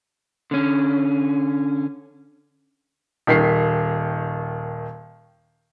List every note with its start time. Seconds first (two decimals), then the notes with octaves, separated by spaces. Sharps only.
0.51 D3 C#4
3.27 D#1 D#3 B6 C7